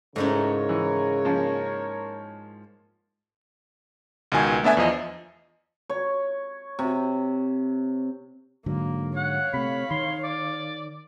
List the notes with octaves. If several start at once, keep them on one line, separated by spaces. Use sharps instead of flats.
G#2 C#3 A3 C#4 D#4 E4 A#4 C#5
E3
F3 A#3 C#4
C#2 B2 D#3 G#5
A3 B3 D4 E5 G#5
E2 F3 D#5
C#5
C3
G#2 D3 F#3 A#3
C#5 F5 F#5
C3 A3 B5
D#3 C6
D5